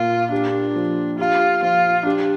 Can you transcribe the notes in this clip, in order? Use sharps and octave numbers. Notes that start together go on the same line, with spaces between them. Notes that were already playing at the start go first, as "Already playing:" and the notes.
Already playing: A#2 A#3 F4
D4 G4
F3
F4 G4
F3 F4
D4 G4